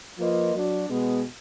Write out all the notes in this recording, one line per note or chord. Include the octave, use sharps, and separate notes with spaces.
F3 A#3 F4 B4 D#5
F#3 D4 F#4 D5
B2 G#3 B3